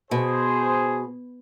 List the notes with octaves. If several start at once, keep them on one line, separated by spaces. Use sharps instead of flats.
B2 G#4 C5